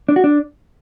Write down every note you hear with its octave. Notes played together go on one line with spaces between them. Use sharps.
D4
F#4
D4